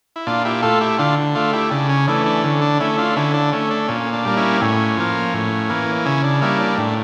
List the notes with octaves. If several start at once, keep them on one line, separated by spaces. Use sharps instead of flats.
E4
A#2 D4 F4
E4 G4
A3 F4 A4
E4 G4
D3 D4 F4
A3 D4 F4
E4 G4
C#3 D4
C#4
E3 A3 D4
D4
D3 C#4
D4
A3 C#4 E4
D4 F4
D3 C#4 E4
D4
A3 C#4
D4
A#2 C#4
D4
G3 A#3
C#4 E4
A2 C#4
F3 A#3
A2
E3 A#3
C#3 C#4 E4
D4
G3 A#3 C#4 E4
D4
A2 D4